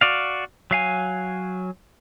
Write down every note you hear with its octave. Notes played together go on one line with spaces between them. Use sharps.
F#4 D5 F5
F#3 F5 G#5